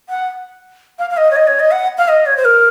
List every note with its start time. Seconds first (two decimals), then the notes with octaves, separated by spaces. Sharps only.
0.09 F#5
0.99 F5
1.10 F5
1.17 D#5
1.31 C#5
1.36 D#5
1.47 C#5
1.60 D#5
1.71 F#5
1.98 F5
2.08 D#5
2.26 C#5
2.37 C5
2.45 A#4